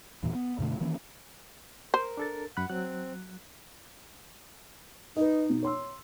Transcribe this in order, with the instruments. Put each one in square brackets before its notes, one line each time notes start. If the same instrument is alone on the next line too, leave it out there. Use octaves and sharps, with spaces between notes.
[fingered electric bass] E2 G2 A#2 E3
B3
F#2 B2 D3 A3
D#3 E3 A#3 C#4
[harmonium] A#4 [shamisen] C5
[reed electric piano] D4 A4 A6
[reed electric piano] F#2 B5 F#6 [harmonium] F#5
[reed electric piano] F#3 F#6 [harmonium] C4
[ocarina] D#4 [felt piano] B4 D#5
[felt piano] B2
C#5 C6 E6